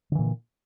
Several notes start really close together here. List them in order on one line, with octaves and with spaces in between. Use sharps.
D3 E3 A#2